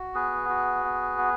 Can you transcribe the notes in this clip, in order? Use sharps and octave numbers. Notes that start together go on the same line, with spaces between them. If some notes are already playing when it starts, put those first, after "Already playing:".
Already playing: F#4
B3 G#4 B4
F#4
B3
B3